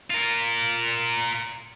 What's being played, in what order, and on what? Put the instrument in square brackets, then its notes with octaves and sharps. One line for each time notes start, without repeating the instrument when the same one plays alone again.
[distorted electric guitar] F4 A#4